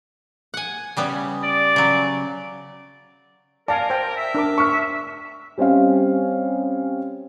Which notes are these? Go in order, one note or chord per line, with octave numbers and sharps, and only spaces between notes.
F#5 G#5
C#3 G3 B3
D5
C#3 F#3
A#4 D5 F5 G#5 A5
C5 G5
E5
D4 A#4 D6
C#6 F6
G3 C4 C#4 D#5 F5